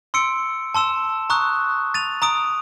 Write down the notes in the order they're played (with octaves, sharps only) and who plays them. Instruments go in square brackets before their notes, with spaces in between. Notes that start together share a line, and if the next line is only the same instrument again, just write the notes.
[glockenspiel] C6 E6 C#7 D7
A5 C6 E6 E7
A#5 C#6 D#6 F#6
A6 D#7 F7
A#5 D#6 D7